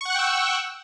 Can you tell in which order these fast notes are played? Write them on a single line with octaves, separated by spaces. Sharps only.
C#6 F#5 F#6 G5 E6